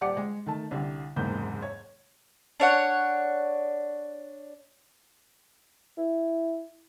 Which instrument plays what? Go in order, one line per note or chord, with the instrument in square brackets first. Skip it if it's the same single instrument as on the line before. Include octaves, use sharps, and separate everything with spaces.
[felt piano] D#1 G4 D5 F#5 D6 C#7
G#3
D#3 A3 A5
C2 D3 G4
F#1 E2 G#2 C3 A#3 G6
C#5
[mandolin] D4 C#5 F#5
[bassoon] E4